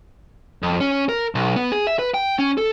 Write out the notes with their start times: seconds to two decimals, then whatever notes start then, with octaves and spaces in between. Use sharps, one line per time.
0.63 F2
0.80 C#4
1.09 A#4
1.35 B1
1.56 B3
1.72 G#4
1.87 E5
1.99 B4
2.14 G5
2.39 C#4
2.57 A4